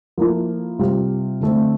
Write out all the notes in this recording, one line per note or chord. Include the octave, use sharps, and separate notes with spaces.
F3 A#3 E4 A4
C3 G3 C4 F4
D3 A3 C4